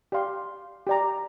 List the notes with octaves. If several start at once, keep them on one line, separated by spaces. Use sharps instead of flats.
G4 D5 F5 C6
G4 D5 A#5